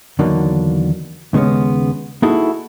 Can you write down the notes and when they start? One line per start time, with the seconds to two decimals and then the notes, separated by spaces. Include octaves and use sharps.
0.19 E2 D3 D#3 F#3 A#3 D4
1.33 D#2 C#3 G#3 B3 C#4
2.22 A#3 D#4 E4 F#4 G#4 A4